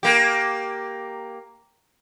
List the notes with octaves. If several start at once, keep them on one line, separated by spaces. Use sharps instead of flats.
A#3 G4